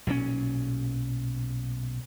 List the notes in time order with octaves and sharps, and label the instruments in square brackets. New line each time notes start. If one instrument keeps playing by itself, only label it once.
[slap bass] B1 A#2 E3 C#4